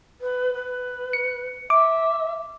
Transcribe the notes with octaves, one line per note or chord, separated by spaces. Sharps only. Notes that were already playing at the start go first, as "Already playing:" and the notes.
B4
B4
C#7
E5 D6